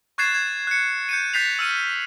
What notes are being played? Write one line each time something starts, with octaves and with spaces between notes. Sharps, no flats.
C#6 F#6 G#6 A6 C7 E7
G#6
F#6 C#7
G6 C#7 D#7
F#6 G6 A6 B6 C7 F7
E6 F6 D#7